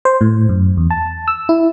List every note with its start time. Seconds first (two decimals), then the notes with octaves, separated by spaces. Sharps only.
0.05 C5
0.21 A2
0.49 F#2
0.77 E2
0.90 A5
1.28 E6
1.49 E4